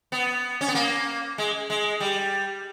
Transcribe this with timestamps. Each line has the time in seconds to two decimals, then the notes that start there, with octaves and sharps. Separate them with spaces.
0.12 B3
0.61 C#4
0.68 B3
0.75 A#3
1.38 G#3
1.70 G#3
2.00 G3